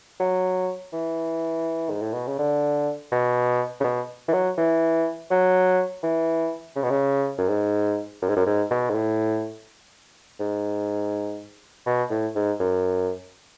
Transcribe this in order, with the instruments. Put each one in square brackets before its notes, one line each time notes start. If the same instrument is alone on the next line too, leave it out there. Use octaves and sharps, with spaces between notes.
[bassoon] F#3
E3
G#2
A2
B2
C#3
D3
B2
C#3
B2
E3
F#3
E3
F#3
E3
C#3
B2
C#3
F#2
G#2
F#2
G#2
F#2
G#2
B2
G#2
A2
G#2
B2
A2
G#2
F#2